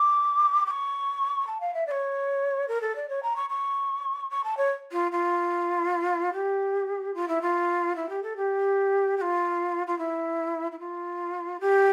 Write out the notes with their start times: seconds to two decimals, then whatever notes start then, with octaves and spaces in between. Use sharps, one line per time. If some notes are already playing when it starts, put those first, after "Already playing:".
Already playing: D6
0.66 D6
0.70 C#6
1.47 A5
1.60 F5
1.74 E5
1.86 D5
1.91 C#5
2.68 A#4
2.81 A4
2.95 D5
3.08 C#5
3.22 A#5
3.36 C#6
3.49 C#6
4.30 C#6
4.44 A5
4.57 C#5
4.92 F4
5.11 F4
6.32 G4
7.14 F4
7.28 E4
7.41 F4
7.95 E4
8.09 G4
8.22 A4
8.36 G4
9.17 G4
9.21 F4
9.87 F4
9.98 E4
10.71 E4
10.79 F4
11.60 G4